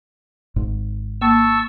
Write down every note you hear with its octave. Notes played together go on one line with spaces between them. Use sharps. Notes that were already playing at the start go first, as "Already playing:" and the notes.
G#1 G#2
A#3 A5 C#6 E6